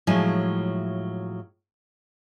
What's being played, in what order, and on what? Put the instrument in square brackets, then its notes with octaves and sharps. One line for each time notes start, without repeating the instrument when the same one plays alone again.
[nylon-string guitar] A2 F3 F#3 G#3 E4 G#5